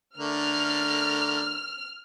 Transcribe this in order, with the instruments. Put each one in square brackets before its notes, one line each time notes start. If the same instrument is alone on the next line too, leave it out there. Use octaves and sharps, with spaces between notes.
[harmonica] D3 A3 A#4 [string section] F6